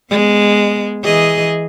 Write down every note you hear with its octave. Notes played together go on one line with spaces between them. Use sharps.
G#3 B3
E3 G#4 D#5